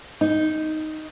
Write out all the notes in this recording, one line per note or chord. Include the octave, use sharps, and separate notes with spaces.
D#4